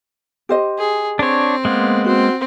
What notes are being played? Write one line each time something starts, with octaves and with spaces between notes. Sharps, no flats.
G4 C5 D#5
G#4
C4 D4 C#5
G#3 A#3 B3
C4 F#4